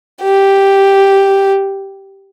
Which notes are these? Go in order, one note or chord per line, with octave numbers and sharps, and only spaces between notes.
G4